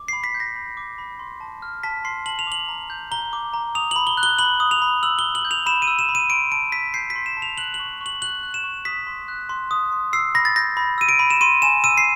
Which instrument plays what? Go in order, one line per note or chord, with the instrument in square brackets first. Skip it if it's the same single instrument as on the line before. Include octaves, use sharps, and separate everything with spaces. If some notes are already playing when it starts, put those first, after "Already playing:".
Already playing: [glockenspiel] D6
B5 C7
B6
G6
A#6
B5
D6
B5
C6
A5
F6
A5 B6
C6 C7
A5 F#7
F7
D6 F#7
A#5
G6
A#5 G7
D6
A#5
D#6 F7
B5 F#7
G7
F#6
G7
B5 F#7
D#6
F7
B5
E6 F#7
G7
B5
F#7
G6
F7
B5 E7
D#7
E6
E7
B5
D#7
C6 D7
A5 D7
E6 B6
G6 C7
B6
C6
E7
A5
F7
F#6 F#7
F#7
C#6
C#6 F#7
F#6 F#7
F#6
E7
C#6
D#6 B6
C6
F#6
C6
D#6
C6
E6 C7
B5 A#6
A6
G6 A#6
B5
E6 D#7
D7
B5
E7
C6 D#7
G#5 E7
E6 D#7
C7